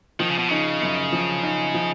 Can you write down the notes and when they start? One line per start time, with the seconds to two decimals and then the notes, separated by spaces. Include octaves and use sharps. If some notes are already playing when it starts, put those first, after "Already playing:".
0.20 D#3 F3
0.29 C#3
0.38 B2
0.49 C#3 D#4
0.82 F#2
1.12 F3
1.43 D#4
1.74 F3